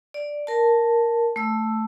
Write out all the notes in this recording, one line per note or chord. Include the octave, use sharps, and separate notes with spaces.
D5
A#4 A5
A3 E6